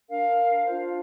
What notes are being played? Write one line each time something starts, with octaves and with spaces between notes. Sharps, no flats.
D4 A#4 F5
D4 F4 C5